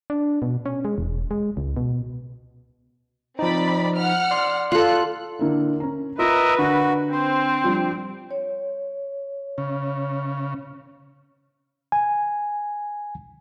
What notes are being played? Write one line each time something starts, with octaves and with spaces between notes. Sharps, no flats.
D4
B2
C#4
G#3
E1
G#3
C#2
B2
F3 C4 D#4 D5 B5
F#5 F6
D5 C6
F4 A4 F#6
D3 A#3 E4
C#4 A#5
F4 A#4 B4 D#5 E5
D3 F#4 F#6
C4 C5
F3 G3 D4
C#5
C#3
G#5